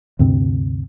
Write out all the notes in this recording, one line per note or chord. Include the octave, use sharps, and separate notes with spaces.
D2 G2 C3 C4